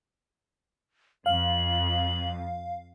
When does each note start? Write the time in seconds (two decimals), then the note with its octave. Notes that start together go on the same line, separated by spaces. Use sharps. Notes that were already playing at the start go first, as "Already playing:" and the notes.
1.26 F2 F5 F#7